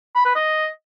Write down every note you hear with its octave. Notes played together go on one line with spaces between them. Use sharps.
B5
B4
D#5